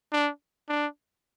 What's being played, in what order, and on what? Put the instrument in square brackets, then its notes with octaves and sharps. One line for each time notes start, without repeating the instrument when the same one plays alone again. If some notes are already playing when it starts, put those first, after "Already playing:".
[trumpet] D4
D4